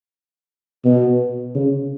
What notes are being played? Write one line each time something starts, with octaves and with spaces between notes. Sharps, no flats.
B2
C#3